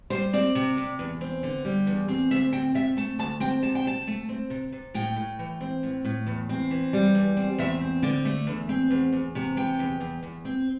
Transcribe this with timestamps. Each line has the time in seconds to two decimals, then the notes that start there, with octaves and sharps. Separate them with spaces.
0.10 G3 C5
0.33 C4 D5
0.55 C3
0.77 C3
0.99 E2
1.21 C4
1.43 D3
1.65 G3
1.87 E2
2.08 C4
2.31 D2 E5
2.52 C4 G5
2.74 C3 E5
2.97 A3 A5
3.19 D2 A5
3.40 C4 G5
3.62 C3 A5
3.75 G5
3.85 C3 A5
4.07 A3
4.29 C4
4.50 C3
4.72 C3
4.94 A2 G5
5.16 A2
5.39 E3
5.61 C4
5.83 A2
6.05 A2
6.27 E2
6.49 C4
6.71 E3
6.93 G3
7.15 E2
7.37 C4
7.58 E2 E5
7.81 C4
8.02 D3 D5
8.25 A3
8.47 E2
8.69 C4
8.91 E2
9.12 E2
9.35 C3
9.57 E3 G5
9.79 E2
10.00 E2
10.23 E2
10.45 C4